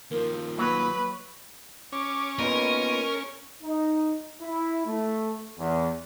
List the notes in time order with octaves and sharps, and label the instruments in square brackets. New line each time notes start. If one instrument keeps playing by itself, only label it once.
[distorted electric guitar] D#2 F3 [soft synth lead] A#4
[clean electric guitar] F#3 [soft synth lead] A#3 [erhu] B4
[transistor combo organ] C#4 [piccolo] D6
[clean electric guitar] A#2 B3 D#4 [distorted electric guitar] A#4 [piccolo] D#7
[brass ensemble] D#4
E4
A3
E2